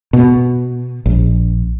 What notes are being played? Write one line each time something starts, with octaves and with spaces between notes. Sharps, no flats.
B2
A#1